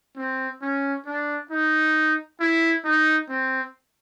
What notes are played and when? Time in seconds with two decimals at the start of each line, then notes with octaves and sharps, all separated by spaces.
0.17 C4
0.62 C#4
1.06 D4
1.51 D#4
2.40 E4
2.85 D#4
3.29 C4